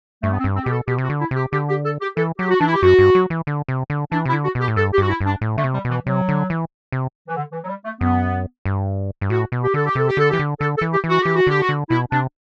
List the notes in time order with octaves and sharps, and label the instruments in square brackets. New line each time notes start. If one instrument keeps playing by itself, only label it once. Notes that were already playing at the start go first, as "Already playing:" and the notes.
[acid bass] G2 [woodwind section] A3
[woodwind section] B3
C4
[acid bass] G2
[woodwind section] C4
[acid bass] B2 [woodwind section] G4
[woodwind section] A4
[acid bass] B2 [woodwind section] G4
[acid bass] C3
[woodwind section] F#4
[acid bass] D3
[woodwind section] E4
[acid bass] C3 [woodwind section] G4
[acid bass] D3 [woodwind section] G4
[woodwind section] G4
A4
G4
[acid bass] E3 [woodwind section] A4
[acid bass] F#3 [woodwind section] G4
[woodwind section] F#4
[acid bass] E3 [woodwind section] D4
[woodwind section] E4
G4
[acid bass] F#2 [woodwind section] F#4
[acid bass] G2
F#3
E3
D3
C3
D3
[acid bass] E3 [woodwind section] D4
[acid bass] C3 [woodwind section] E4
[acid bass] D3
[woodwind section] F#4
[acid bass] B2
[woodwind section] G4
[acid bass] A2
[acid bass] G2 [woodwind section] A4
[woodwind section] G4
[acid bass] G2 [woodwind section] F#4
[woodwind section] E4
[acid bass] G2
[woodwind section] D4
[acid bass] A2
[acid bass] D3 [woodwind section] A3
[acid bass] C3
[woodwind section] G3
[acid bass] B2
[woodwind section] E3
[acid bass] C3 [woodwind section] F#3
[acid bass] D3
E3
C3
[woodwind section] E3
D3
E3
F#3
G3
A3
[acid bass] F#2 [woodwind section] B3
[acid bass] G2
G2
[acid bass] A2 [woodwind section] F#4
[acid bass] B2
[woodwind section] G4
[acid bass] D3 [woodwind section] A4
[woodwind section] G4
[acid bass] C3 [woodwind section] A4
[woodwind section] G4
[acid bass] D3 [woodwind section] A4
[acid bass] E3 [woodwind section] G4
[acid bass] D3
[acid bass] D3 [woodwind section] A4
[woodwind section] A4
[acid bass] E3
[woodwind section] G4
[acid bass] E3
[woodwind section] F#4
[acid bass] E3 [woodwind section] G4
[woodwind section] F#4
[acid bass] D3 [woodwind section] G4
[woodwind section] F#4
[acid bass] D3
[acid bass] B2 [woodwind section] E4
[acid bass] C3 [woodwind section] D4